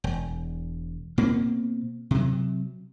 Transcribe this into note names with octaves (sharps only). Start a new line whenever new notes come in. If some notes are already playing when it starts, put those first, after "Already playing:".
E1
B2 A#3 C4
C3 F#3